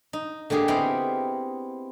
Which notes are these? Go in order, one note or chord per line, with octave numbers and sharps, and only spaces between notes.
D#4
D3 A#3 G4 G#4
B3 C4 E4 D#5 F5 G5